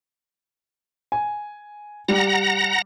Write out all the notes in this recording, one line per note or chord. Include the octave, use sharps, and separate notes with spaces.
G#5
G3 F#5 A#5 A#6